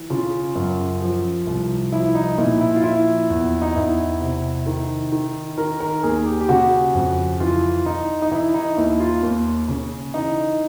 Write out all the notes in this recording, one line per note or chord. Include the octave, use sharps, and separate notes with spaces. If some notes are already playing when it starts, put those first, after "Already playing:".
Already playing: E3
C#3 F4
F#2
F3
C2
F3 E4
D#4
A#2 E4
E4
F4
F3 E4
E2
D#4
E2 E4
C3
D#3
D#3
D#3 A#4
A#4
D#2 G#4
G4
G4
C#3 F#4
F2
E3 F4
E3 D#4
D#4
E3 E4
D#4
D#2 E4
F4
D#2
C#3
E3 D#4